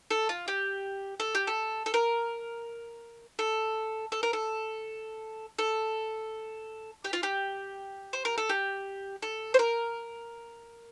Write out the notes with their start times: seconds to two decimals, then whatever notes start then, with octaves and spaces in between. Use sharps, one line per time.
0.11 A4
0.29 F4
0.48 G4
1.20 A4
1.35 G4
1.47 A4
1.86 A4
1.94 A#4
3.39 A4
4.12 A4
4.23 A#4
4.33 A4
5.59 A4
7.04 G4
7.13 F4
7.23 G4
8.13 C5
8.25 A#4
8.38 A4
8.49 G4
9.22 A4
9.54 C5
9.59 A#4